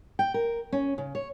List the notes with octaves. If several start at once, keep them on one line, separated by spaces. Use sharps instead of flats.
G5
A#4
C#4
C#3
C#5